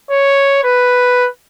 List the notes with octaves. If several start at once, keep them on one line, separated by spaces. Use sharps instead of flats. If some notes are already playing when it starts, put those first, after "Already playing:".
C#5
B4